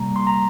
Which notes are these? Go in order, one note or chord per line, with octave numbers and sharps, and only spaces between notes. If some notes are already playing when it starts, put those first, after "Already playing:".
Already playing: C3 G3 A#3 A#5
C6
A#5